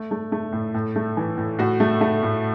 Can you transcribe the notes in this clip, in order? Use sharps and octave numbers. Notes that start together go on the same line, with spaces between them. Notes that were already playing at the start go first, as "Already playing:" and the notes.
Already playing: A3
A3
A3
A2
A2
A3
E3
A2
A2 F#4
A3
A3
A2